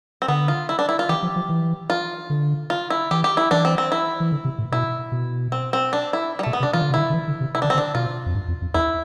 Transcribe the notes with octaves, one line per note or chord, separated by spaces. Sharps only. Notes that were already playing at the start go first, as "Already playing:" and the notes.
C4
D3 B3
F4
E4
D4
E4
F4
E3 G4
F3
F3
E3
F4
D3
F4
E4
E3 G4
G4
E4
E3 D4
C4
C4
E4
E3
D3
C3
A2
B2 E4
B2
C4
C4
D4
E4
G3
B2 A3
B3
C3
D4
E3 F4
D3
C3
D3 E4
D3
E3
D3
C3
E4
D3 D4
C4
D3
D4
B2 F4
F2
G2
F2
F2
E2 E4